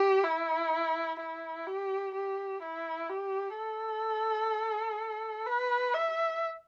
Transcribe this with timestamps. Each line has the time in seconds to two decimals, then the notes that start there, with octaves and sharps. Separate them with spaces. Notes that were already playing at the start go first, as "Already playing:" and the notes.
Already playing: G4
0.23 E4
1.19 E4
1.67 G4
2.14 G4
2.62 E4
3.09 G4
3.56 A4
5.46 B4
5.93 E5